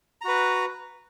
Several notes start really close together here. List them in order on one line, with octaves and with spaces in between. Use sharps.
A#5 F#4 B4